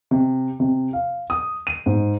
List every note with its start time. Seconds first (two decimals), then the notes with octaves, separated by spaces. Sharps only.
0.11 C3
0.60 C3
0.93 F5
1.30 D#6
1.67 D#7
1.86 G#2